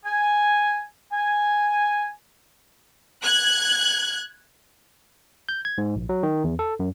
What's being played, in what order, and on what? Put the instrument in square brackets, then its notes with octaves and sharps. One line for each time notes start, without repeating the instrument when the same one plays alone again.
[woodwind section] G#5
G#5
[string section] F#6 G#6
[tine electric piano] G6
G#6
G#2
A#1
F#3
D#3
E2
A4
F#2